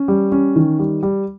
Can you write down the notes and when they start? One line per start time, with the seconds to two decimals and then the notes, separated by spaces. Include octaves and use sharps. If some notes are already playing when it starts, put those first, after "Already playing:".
Already playing: C#4
0.08 G3
0.32 C#4
0.56 D#3
0.79 G3
1.03 G3